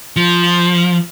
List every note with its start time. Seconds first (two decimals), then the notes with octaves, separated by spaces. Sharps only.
0.16 F3